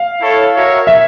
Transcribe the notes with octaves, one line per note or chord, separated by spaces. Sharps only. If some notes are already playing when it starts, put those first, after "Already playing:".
Already playing: F5
E4 A4 C#5
F#4 A#4 C#5 E5
E5